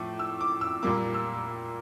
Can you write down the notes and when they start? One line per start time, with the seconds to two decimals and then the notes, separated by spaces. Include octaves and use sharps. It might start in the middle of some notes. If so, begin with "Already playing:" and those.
Already playing: A2 F3 A3 D6
0.19 E6
0.41 D6
0.61 E6
0.83 A#2 G3 A#3 D6
1.14 E6